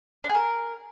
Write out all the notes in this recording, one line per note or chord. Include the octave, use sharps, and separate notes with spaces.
D4
G#4
A#4